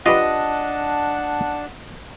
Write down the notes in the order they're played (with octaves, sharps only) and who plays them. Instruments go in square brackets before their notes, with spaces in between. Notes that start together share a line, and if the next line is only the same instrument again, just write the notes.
[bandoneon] D4 A5 [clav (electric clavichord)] F4 G4 B4 [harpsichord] D#5 [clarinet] F#5